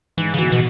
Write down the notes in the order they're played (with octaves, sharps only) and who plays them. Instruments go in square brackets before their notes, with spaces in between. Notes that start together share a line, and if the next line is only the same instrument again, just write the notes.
[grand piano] G#2 [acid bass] E3
[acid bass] C#3
[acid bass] E3 [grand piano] F#3 B3 F#4
[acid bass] B2